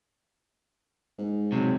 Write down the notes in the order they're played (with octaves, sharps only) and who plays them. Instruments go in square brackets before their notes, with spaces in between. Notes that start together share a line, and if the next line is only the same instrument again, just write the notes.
[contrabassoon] G#2
[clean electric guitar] C3 F#3